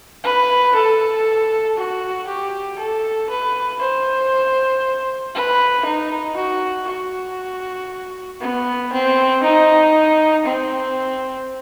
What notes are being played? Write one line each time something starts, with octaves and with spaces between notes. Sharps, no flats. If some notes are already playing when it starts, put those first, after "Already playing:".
B4
A4
F#4
G4
A4
B4
C5
B4
D#4
F#4
F#4
B3
C4
D#4
C4